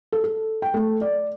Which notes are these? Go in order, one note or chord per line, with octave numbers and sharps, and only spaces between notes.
A4
A4
G5
A3
D5